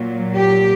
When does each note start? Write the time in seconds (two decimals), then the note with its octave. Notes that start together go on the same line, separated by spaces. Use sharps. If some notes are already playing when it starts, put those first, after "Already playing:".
Already playing: A#2 F#3
0.34 G4